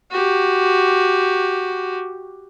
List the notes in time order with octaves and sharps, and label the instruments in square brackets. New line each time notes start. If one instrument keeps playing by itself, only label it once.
[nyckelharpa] F#4 G4